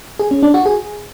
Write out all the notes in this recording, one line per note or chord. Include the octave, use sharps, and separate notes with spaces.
G#4
C#4
D4
F#4
G#4